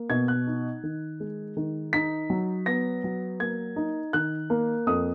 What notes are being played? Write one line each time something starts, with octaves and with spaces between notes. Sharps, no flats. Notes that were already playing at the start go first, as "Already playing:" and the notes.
Already playing: A#3
B2 G#6
F#6
D#4
D#3
G#3
D#3
D#4 B6
F#3
B3 A#6
F#3
A#3 G#6
D#4
D#3 F#6
A#3
F2 D#6